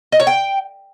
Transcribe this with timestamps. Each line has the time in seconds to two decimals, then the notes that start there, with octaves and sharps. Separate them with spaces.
0.12 D#5
0.20 C#5
0.27 G5